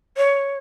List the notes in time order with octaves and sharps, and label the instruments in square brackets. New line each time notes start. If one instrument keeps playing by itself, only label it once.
[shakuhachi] C#5